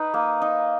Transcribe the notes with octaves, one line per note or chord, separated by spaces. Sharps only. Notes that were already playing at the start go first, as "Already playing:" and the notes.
Already playing: D#4 B4
A#3
D#4